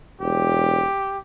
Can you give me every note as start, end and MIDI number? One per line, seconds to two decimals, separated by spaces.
0.21 0.85 28
0.21 1.18 67